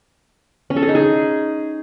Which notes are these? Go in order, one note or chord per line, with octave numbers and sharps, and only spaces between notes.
C#4
A4
G#4
D#4
G#4